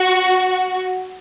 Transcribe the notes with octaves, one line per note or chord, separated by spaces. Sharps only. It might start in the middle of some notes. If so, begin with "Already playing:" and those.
Already playing: F#4